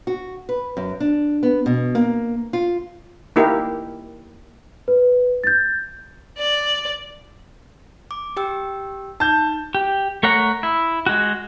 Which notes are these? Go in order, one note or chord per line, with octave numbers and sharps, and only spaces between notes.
F#4
B4
F#2
D4
B3
B2
A#3
F4
A#3 D#4 E4 G4 A#4
B4
G6 A6
D5
D6
G4 G5 E6
D#4 A5 G6
G4
A3 A#4 C#5 F#5 A#5
E4
G#3 F#4